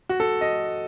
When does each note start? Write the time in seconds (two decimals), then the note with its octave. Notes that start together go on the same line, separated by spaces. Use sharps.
0.09 F#4
0.20 A4
0.41 D#5